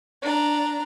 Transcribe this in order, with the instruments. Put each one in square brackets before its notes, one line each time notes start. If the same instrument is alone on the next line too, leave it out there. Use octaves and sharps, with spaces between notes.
[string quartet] D4 A#5